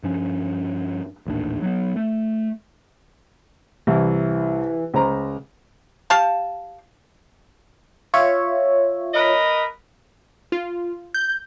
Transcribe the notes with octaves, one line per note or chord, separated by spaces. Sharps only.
G2 F3 C#4
A1 D#2 A#2 D4
F#3 B3
A3
C2 E3
C#2 C5 A#5
G4 F5 A5
F4 C#5 E5
A#4 B4 D#5
F4
G6